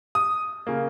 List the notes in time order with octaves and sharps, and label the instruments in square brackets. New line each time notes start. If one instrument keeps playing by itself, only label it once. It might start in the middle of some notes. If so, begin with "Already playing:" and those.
[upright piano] D#6
C#3 A#3